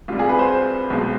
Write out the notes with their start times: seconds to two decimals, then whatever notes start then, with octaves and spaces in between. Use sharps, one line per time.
0.08 C2 C3 G3 F4
0.19 G#4
0.29 B4
0.39 C5
0.90 B1 B2 G#3